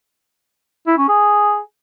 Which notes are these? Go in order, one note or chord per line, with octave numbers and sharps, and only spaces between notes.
E4
C#4
G#4